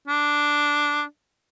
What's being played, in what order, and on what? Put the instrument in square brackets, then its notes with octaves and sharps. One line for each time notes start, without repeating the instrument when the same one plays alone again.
[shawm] D4